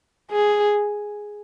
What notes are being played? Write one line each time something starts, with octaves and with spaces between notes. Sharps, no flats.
G#4